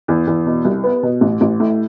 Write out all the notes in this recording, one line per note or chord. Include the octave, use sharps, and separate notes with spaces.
E2
E2
B2
C2
B3
B2
A1
A1
A2